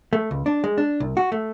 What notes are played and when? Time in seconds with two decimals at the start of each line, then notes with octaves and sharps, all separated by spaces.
0.13 A3
0.31 C#2
0.46 D4
0.64 G#3
0.78 D4
1.00 C2
1.17 F#4
1.32 A3